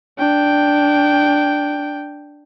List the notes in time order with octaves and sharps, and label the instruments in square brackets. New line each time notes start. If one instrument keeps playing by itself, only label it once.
[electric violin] D4 G5